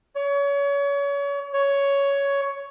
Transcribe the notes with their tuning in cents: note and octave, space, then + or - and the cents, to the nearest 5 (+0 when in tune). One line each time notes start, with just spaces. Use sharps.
C#5 +30
C#5 +10